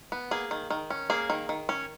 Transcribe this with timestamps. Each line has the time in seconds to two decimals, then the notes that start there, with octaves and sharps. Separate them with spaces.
0.12 B3
0.31 A#3 G#4
0.51 D#3
0.70 D#3
0.90 C#4
1.10 A#3 G#4
1.30 D#3
1.49 D#3
1.69 C#4